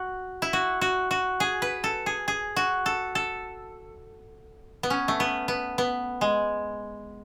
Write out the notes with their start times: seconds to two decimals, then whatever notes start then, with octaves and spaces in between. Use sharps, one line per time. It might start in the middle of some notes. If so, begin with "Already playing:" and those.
Already playing: F#4
0.42 E4
0.53 F#4
0.81 F#4
1.11 F#4
1.40 G#4
1.62 B4
1.84 A4
2.06 G#4
2.28 G#4
2.56 F#4
2.86 A4
3.15 A4
4.83 B3
4.90 C#4
5.08 A3
5.20 B3
5.48 B3
5.78 B3
6.21 G#3